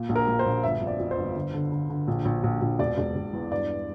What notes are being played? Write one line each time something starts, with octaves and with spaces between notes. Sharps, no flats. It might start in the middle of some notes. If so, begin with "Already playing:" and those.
Already playing: A#2
A#1
A#4
A#2
C5
A#1
G1 E5
F2
D5
F2
C5
G1
D3
D3
D3
D3
A#1
A#1
A#1
A#1
E1 D5
E1
E1
E2
G2 D5